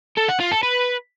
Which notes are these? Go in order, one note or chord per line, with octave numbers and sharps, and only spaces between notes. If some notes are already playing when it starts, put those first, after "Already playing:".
A4
F#5
F4
A4
B4